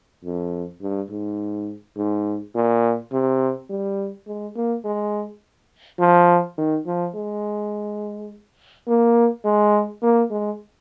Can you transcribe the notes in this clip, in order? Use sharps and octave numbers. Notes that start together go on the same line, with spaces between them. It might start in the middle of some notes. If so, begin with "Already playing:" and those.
F2
G2
G#2
G#2
A#2
C3
G3
G#3
A#3
G#3
F3
D#3
F3
G#3
A#3
G#3
A#3
G#3